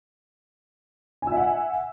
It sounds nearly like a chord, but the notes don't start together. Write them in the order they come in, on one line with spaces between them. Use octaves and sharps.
G#5 E6 E5 F#5